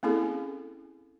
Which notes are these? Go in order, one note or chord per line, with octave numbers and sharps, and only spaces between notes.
A#3 C4 C#4 E4 G#4 A4